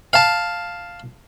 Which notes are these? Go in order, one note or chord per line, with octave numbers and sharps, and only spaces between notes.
F5 A5